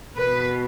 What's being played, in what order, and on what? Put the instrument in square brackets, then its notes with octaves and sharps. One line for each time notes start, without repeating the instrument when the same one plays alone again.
[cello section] B2 B4